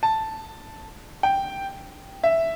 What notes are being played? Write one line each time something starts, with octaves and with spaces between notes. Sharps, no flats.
A5
G5
E5